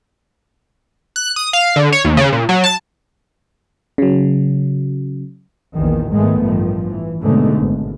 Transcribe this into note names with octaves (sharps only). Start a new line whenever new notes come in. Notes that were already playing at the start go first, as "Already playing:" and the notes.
F#6
D#6
F5
D3
C#5
D#2
C#3
A#2
F#3
A5
C#3 F#3
A#1 E2 D#3
G#1 G#2 D#3 G#3 A3 B3
A1 G2 D#3 F3
E3
D#2 G#2 B2 D3 A3
G#1